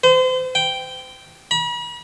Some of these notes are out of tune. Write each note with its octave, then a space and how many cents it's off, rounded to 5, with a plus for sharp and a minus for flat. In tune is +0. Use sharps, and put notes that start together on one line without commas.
C5 -35
G5 -5
B5 -45